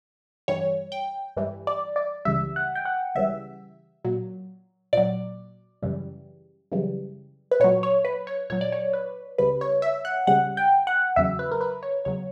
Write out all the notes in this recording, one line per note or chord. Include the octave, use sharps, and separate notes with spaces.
G2 E3 G3 C#5
G5
G2 E3 G3
D5
D5
C#2 C#3 E3 G3 E5
F#5
G5
F#5
C#2 C#3 E3 G3 E5
A#2 F#3
A#2 F#3 D5
F#2 C#3 E3 G3
F#2 C#3 E3 G3
B4
A#2 F#3 C#5
C#5
B4
C#5
A#2 F#3 C#5
D5
C#5
B4
C#2 C#3 G3 B4
C#5
E5
F#5
C#2 C#3 G3 F#5
G5
F#5
E2 C#3 F#3 E5
B4
A#4
B4
C#5
E2 C#3 F#3 C#5